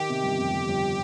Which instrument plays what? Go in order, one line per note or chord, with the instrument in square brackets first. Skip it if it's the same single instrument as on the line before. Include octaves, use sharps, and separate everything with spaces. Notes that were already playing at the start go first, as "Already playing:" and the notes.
Already playing: [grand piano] D#3 [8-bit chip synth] G4
[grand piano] C3
G1
F2
G1
G1